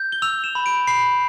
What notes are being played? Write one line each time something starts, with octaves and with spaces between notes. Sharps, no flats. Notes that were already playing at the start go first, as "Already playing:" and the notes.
Already playing: G6
G7
E6 F7
E7
B5
D7
B5 C7